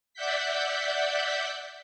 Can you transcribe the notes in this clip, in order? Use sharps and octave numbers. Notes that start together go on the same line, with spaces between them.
D5 E5 F#5 G6 B6